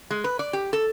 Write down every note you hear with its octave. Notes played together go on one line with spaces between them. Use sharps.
G#3
B4
D5
G4
A4